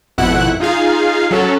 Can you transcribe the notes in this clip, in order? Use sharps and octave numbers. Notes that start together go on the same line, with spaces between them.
G#1 F2 B2 E4 F#5 F#6
D#4 F4 G#4 F5
F#3 C#4 A4